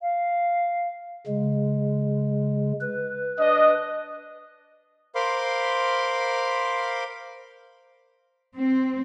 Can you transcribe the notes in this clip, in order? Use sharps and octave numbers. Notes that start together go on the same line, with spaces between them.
F5
C#3 G#3
B4
D4 D#5
A#4 C5 F5 B5 C6 D6
C4